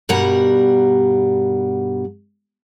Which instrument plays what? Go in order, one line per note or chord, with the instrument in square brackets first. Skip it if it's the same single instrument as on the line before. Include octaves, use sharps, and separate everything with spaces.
[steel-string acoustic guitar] G2 B2 G3 A#4 F#5 A#5